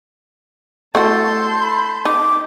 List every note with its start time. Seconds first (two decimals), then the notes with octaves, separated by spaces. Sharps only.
0.95 A3 E4 F#4 A4 A5 C6 G6
1.62 B5
2.05 D#4 D6